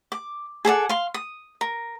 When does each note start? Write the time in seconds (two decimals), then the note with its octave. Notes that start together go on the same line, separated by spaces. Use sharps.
0.12 D6
0.65 G#4 A4 D5 F#5
0.89 F5 C6
1.14 D#6
1.61 A#4